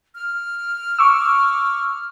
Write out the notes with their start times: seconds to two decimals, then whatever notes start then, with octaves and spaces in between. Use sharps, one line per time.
0.15 F6
0.99 C#6 D6 E6